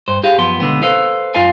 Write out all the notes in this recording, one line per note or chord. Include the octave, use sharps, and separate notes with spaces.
G2 C5
G4 G#4 F5
F#2 F3 B3 C6
C#2 B2 D3 F#3 B3
A4 B4 C5 F5
F#2 F4 D5 F5 G#5